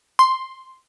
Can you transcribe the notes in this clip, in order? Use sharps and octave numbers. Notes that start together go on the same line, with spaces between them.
C6